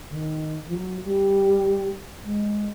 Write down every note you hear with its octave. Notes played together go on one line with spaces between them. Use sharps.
D3
D#3
F3
F#3
G3
G#3